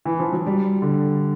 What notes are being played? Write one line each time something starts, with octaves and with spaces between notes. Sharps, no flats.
E3
F3
F#3
G3
D3